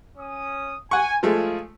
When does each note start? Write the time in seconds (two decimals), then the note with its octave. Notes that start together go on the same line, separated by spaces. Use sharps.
0.18 C#4 D#6
0.91 F#5 G#5 C#6
1.23 F3 G#3 A3 F4 G#4